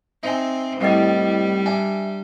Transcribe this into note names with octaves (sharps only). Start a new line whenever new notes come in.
C4 D#4 E5 G#5
C2 A2 G3 C5 D#5 A6
D4 E5 G#5